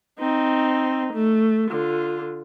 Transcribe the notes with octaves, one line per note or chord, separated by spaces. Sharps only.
C4 D#4
A3
D3 F4